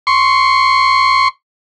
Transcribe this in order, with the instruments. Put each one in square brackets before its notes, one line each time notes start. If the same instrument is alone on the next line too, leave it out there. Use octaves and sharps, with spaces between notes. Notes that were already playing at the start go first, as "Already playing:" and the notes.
[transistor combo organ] C6 C#6